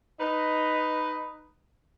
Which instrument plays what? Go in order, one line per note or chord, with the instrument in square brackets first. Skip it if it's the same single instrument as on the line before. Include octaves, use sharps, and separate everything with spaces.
[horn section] D#4 B4 D#5